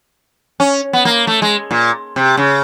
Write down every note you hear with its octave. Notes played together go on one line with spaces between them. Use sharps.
C#4
B3
A#3
A3
G#3
A#2
C3
C#3